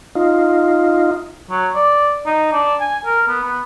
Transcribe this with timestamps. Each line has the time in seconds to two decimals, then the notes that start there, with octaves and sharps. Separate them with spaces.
0.15 D#4 F4
1.50 F#3
1.75 D5
2.26 D#4
2.53 D4
2.80 G#5
3.05 A#4
3.28 B3
3.44 B3